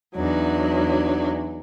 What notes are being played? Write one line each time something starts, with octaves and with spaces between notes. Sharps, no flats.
E2 F#3 D4 D#4